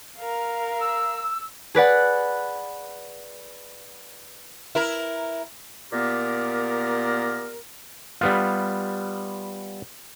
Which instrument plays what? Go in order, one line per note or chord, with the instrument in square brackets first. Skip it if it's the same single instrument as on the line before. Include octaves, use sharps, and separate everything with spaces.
[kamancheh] A#4 F5
[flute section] E6
[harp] G#4 B4 D5 F#5
[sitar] E4 A#4
[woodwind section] A#2 B3 G4 A#4
[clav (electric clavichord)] G3 B3 F4